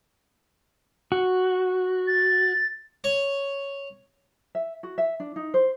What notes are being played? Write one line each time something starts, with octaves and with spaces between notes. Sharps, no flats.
F#4
A6
C#5
E5
F#4
E5
D4
D#4
C5